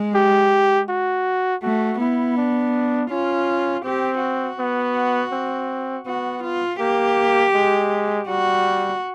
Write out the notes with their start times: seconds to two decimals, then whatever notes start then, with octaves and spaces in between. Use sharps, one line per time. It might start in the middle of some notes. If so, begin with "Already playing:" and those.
Already playing: G#3
0.15 G4
0.89 F#4
1.63 A3 F#4
1.99 B3 E4
2.37 D4
3.10 C#4 F4
3.85 C4 G4
4.22 F#4
4.59 B3
5.32 C4
6.06 B3 F#4
6.44 F4
6.80 A#3 G4
7.54 G#3
8.28 G3 F#4